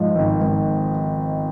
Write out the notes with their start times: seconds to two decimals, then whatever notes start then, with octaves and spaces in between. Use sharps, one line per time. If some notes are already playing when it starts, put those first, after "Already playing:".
Already playing: G#2 F3
0.15 G#1
0.41 G#1